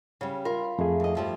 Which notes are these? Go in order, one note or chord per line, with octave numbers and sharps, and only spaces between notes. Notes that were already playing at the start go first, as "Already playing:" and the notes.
C#3 G3
F4 A#4 B5
F2 A3 G#4
D#2 D#5
G2 F3 G3